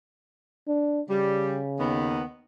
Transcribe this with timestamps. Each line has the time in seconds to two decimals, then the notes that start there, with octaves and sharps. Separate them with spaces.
0.68 D4
1.10 C#3 G3
1.79 D#2 D#3 B3